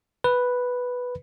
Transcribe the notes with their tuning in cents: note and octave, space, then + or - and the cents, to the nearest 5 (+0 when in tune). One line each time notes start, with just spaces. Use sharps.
B4 +0